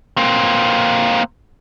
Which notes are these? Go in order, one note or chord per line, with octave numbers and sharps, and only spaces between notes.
A#3 C4